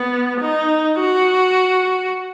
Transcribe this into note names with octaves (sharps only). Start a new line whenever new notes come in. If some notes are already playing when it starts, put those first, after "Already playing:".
Already playing: B3
D#4
F#4